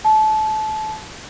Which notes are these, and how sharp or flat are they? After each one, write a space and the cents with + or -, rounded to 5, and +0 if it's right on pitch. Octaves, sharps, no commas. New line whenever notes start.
A5 -25